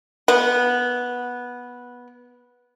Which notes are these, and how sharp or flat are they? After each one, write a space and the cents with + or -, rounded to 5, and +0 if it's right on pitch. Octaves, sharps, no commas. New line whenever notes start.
B3 -10 F#5 -5